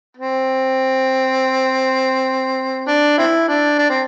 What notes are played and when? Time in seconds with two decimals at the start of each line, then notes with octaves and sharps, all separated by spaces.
0.17 C4
2.88 D4
3.18 C4 E4
3.49 D4
3.79 D4
3.90 C4